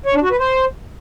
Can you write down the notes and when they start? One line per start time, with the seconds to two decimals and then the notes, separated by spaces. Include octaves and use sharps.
0.06 C#5
0.14 D4
0.23 F#4
0.31 B4
0.40 C5